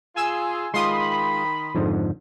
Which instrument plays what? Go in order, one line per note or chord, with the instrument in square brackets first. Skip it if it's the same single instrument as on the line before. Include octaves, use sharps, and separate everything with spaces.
[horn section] F4 G#4 [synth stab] G#5 E6
[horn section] D#3 B5 [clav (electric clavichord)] G#3 F4 [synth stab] C6 D#6
[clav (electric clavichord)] F2 G#2 D3